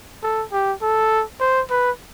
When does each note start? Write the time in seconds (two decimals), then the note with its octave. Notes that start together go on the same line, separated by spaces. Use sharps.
0.23 A4
0.52 G4
0.82 A4
1.40 C5
1.70 B4